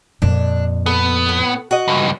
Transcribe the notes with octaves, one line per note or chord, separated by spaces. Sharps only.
F2 A#2 D4
B3 A4
A2
F#4 D#5
C#2 G2